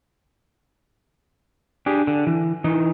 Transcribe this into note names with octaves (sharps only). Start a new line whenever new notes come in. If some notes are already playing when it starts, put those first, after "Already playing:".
D4 G4 G#4
D3
E3
E3 D#4